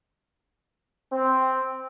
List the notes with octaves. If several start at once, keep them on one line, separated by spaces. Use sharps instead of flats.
C4